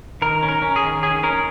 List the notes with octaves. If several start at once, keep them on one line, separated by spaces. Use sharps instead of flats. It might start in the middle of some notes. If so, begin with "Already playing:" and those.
D#3 A#4
C#4
A#4
C#4
G#4
D#3
C#4 G#4
C#4 A#4